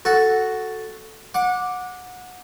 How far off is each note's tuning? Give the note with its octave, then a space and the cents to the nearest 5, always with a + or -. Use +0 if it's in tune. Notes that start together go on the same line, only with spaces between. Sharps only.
F#4 +0 A4 +0
F#5 -25 D6 +0